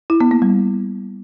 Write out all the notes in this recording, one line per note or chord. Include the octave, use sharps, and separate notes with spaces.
E4
B3
A#3
G3